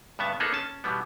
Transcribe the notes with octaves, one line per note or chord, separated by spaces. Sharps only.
G2 C#3 B3 E5 A5
A#3 B3 D#4 G#4 A4
C#4 A5
B2 E3 G3 B3